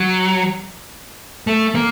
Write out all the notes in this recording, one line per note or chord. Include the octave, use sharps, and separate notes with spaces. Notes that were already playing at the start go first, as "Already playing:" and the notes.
Already playing: F#3
A3
A#3